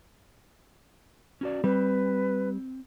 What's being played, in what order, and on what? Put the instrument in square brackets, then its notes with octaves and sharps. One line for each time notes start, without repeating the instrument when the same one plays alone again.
[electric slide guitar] C#4 F#4 D5
[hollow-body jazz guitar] G3 [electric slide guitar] C4 [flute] B4